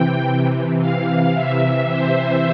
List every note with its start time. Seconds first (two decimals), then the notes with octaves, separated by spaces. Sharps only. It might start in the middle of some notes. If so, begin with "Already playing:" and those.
Already playing: C3 E3 G5
0.24 C3 E3
0.80 F5
1.34 C3 E3 E5
1.89 C5